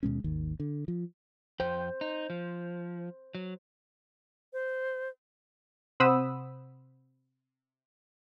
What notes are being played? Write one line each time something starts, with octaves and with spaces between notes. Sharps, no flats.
D#2 B2 G#3 C#4
G#1 D#2 D#3
D3
F3
F2 C5 G5
D#4
F3
F#3
C5
C3 C5 F#5 B5 D#6 E6